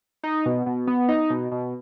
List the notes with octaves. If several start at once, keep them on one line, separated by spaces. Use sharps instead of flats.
D#4
B2
B2
B3
D#4
B2
B2